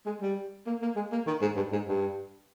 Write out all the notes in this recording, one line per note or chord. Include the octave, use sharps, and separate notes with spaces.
G#3
G3
A#3
A#3
G#3
A#3
D#3
G#2
G2
G#2
G2